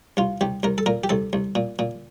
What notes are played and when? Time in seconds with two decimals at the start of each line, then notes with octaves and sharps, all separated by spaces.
0.17 C2 F4
0.41 C2 G4
0.63 C2 A#4
0.78 A4
0.86 A#2 A#4
1.04 G4
1.09 C2 A4
1.33 C2
1.55 A#2
1.79 A#2